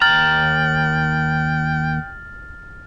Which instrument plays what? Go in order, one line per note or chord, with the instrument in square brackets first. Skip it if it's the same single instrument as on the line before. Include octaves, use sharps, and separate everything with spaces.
[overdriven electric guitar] D#2 A#5 [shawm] G5 [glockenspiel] F6 A6 F#7